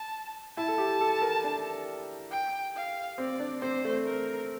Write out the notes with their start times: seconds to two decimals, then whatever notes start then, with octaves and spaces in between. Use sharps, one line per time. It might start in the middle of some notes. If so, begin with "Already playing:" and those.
Already playing: A5
0.57 E4 A5
0.68 A4
0.78 G4
1.01 A4
1.22 A#4
1.44 D4
2.31 G5
2.75 F5
3.18 C4 D5
3.40 D4
3.62 C4 C5
3.85 A3
4.05 A#4